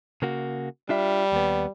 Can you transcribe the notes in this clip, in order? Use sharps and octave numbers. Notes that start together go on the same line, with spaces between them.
C#3 A#3 F#4
G3 D4 F4 E5
D#2 B3